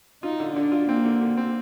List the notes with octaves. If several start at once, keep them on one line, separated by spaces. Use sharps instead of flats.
D#4 F4
D3
D3 D4
F4
A#3 C4
D3
D3
C4